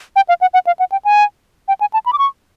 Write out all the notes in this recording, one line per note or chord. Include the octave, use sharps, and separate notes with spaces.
G5
F5
F#5
F#5
F5
F#5
G5
G#5
G5
G#5
A5
B5
D6
C#6